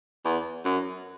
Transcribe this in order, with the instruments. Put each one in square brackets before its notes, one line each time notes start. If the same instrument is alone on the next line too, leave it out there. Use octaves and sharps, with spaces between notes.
[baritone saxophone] E2
F#2